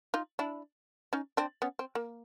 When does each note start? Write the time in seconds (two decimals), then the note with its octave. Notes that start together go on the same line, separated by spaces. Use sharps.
0.14 D#4 F4
0.39 D4 E4
1.13 C#4 D#4
1.37 C4 D4
1.62 B3 C#4
1.79 C4
1.95 A#3